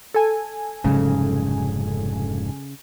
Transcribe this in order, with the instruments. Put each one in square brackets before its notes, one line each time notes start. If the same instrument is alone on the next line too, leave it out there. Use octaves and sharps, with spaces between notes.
[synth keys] A4 G#5
[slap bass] F1 G#2 F#3 [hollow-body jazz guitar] C#3